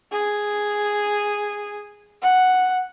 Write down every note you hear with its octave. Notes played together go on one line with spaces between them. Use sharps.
G#4
F#5